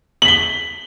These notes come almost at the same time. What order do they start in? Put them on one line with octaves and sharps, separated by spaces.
F#7 B6 G7